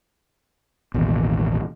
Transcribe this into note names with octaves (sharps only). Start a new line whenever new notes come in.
A1 D#2 B2